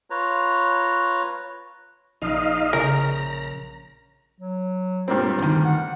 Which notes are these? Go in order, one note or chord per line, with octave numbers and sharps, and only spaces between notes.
F4 B4 C#5 A#5
A#1 D#4 D#5 F5
C#3 A#4 A#5 G6
F#3
G2 A#3 C4 F4
D2 D#3
F#5